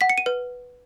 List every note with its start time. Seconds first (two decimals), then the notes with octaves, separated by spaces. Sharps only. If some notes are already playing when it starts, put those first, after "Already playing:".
0.01 F#5 B6
0.10 C#7
0.18 D#7
0.26 B4